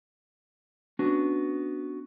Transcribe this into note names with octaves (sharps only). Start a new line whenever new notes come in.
B3 C#4 D4 F#4